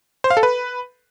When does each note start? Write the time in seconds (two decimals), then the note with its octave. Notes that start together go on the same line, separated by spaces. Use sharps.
0.24 C5
0.30 F5
0.37 A4
0.43 B4